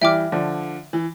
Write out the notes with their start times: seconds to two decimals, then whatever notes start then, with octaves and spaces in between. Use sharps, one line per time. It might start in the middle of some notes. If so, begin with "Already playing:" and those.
0.01 E3 G3 E5 G5 D6 F6
0.32 D3 F3
0.93 E3